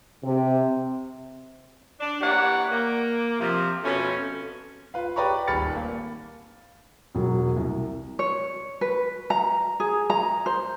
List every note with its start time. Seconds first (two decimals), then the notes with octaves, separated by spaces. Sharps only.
0.23 C3
2.00 D4
2.21 E3 A#3 G4 C#5 D5 F#5
2.71 A#3
3.40 C3 F3
3.84 F2 B2 A3 C#4
4.94 F4 B4 F5
5.16 G4 B4 D5 A#5 B5 C#6
5.47 D#1 G#1 B5 F6 A6 C#7
5.76 A#3
7.15 E1 F#3
7.57 C2
8.19 C#5
8.81 B4
9.30 A#5
9.80 G#4
10.10 A#5
10.46 C5